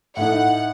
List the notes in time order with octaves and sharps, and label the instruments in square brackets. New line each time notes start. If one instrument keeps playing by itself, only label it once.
[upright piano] A2 A3 D#4 [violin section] F#5